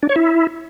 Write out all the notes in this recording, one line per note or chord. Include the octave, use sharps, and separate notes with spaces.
D4
C#5
E4